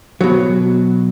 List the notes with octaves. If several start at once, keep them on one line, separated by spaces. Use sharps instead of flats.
B2 F#3